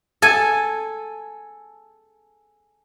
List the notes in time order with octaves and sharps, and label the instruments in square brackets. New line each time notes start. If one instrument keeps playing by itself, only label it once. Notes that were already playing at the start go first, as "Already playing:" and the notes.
[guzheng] A4 G#5